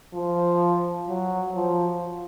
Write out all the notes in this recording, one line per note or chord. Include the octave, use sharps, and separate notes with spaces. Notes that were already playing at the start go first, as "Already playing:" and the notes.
F3
F#3
F3